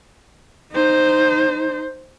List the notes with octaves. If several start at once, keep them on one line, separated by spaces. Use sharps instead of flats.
D#4 C5